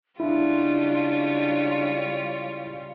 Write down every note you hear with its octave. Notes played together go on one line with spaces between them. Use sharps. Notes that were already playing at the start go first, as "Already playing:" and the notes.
C#3 G3 G#3 D4 E4 F4 C#5